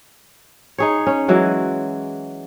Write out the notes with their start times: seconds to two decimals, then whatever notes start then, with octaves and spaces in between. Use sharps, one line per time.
0.78 D#4 G#4 C#5
1.07 C#4
1.28 E3 F#3 G#3